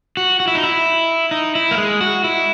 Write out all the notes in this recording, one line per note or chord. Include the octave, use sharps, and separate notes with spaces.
F#4
F#4
E4
D#4
E4
D#4
E4
A#3
G#3
F#4
E4